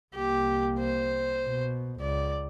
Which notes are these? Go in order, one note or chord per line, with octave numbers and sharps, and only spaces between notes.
C2 A#3 G4
C5
B2
C#2 D5